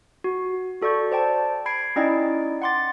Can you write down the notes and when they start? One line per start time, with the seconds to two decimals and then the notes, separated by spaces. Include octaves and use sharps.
0.24 F#4
0.82 F#4 A4 D5 C#6 G6
1.12 C5 D5 G5 A5
1.66 B5 G#6 C7 D7
1.96 C#4 D#4 E4 D5 D#5 G5
2.62 F#5 G5 C6 D6 A6